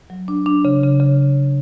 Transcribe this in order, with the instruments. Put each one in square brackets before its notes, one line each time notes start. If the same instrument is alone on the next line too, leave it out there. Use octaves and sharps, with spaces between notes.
[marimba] F#3
D4
D4
C#3
C#3
C#3